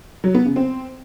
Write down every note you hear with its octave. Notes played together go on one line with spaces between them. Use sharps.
F#3
B3
C#3
C4